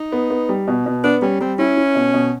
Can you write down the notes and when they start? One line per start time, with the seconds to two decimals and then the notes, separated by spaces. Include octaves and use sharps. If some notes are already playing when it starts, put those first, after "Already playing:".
Already playing: D#4
0.12 B3
0.30 B3
0.49 G3
0.68 B2
0.86 B2
1.04 B3 D4
1.22 G3 C#4
1.41 G3 C4
1.59 C#4 E4
1.77 E4
1.95 B2
2.14 B2